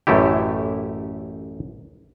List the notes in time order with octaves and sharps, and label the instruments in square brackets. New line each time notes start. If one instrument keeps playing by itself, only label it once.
[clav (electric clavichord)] A1 F#2 A3 E4 G4